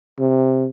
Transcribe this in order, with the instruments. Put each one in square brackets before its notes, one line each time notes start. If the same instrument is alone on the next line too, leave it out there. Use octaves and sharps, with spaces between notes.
[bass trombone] C3